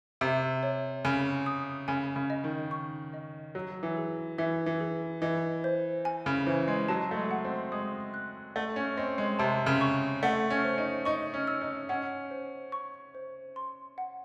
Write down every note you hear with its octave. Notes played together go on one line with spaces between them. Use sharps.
C3 E5
C#5
C#3 G#5
D#6
C#3 G#5
C#3
D#5
D#3
C#6
D#5
F#3 C#5
E3
G#4
E3 E5
E3
G#4
E3 D#5
C5
G#5
C#3
E3 C5
G#3
F#3 A5
A3
G#3
F#5
C4
G#3 D#6
F#6
A3 F#5
C#4
C4 D#5
G#3
C3 A5
C#3
C#6
A3 F#5
C#4
C5
D#4
D#4 C#6
C#4
E6
D#4
C#4 F#5
C5
C#6
C5
C6
F#5